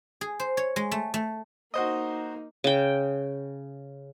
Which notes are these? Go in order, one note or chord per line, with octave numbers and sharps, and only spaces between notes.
G#4
C5
C#5
G#3
A3
A3
A#3 D#4 F#4 C5 D#5
C#3 G5